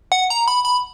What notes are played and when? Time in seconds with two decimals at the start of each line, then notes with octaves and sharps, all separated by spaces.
0.12 F#5
0.30 A#5
0.48 B5
0.65 B5